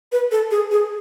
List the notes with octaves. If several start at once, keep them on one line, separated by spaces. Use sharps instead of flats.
B4
A4
G#4
G#4